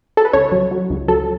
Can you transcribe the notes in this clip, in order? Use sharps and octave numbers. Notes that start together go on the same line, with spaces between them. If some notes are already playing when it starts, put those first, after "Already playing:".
A4
B4
C#2 C#5
F#3
F#3
C#2
F#3 A4